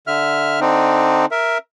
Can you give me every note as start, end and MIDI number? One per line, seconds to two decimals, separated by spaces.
0.07 0.60 50
0.07 0.60 76
0.07 0.60 89
0.61 1.26 50
0.61 1.26 60
0.61 1.26 62
0.61 1.26 63
1.31 1.58 70
1.31 1.58 76